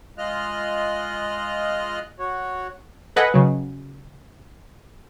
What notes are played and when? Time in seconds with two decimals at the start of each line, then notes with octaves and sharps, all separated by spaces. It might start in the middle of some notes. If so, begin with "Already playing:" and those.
0.18 G#3 F4 D#5 F6 F#6
2.19 F#4 C#5
3.16 A4 B4 D#5 F#5 G#5
3.34 C#3 F#3